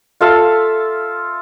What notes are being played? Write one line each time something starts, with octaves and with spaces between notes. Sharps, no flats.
F4 A4 E5 F5